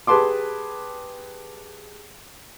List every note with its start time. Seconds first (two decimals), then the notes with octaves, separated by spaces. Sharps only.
0.07 G4 G#4 B4 A5 C6 D6